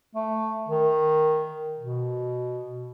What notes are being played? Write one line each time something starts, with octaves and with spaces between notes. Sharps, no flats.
A3
D#3
B2